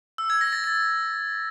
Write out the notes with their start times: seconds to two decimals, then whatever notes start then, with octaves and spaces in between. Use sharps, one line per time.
0.18 E6
0.30 G#6
0.41 A#6
0.53 A6
0.64 A6